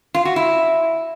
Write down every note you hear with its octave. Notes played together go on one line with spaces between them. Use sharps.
F4
F#4
E4